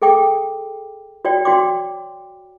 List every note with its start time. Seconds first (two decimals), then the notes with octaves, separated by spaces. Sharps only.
0.02 G#4 A4 G5 D6
1.25 F#4 C#5 D5 G5
1.45 F#4 G5 C6 D6